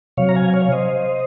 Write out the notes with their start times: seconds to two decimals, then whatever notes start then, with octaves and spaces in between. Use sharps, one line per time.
0.17 C3 F#3 C#5 F5
0.29 A#5
0.35 F5 G#5
0.54 C#5 F5
0.66 C#5
0.72 C5 D#5